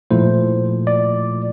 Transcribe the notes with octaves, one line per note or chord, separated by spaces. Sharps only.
A#2 F3 A3 E4 C5
D5